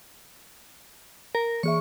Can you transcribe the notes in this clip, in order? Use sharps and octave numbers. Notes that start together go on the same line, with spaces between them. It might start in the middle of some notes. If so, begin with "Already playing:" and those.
A#4
E3 G#4 E5 C#6